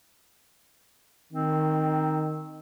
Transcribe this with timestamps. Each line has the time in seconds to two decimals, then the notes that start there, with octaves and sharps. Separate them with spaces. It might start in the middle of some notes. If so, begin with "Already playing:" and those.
1.33 D#3 C4